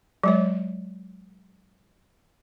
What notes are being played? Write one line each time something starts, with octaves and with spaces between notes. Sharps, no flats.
F#3 G#3 C#5